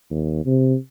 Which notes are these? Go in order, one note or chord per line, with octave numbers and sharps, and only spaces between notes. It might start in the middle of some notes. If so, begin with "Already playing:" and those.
D#2
C3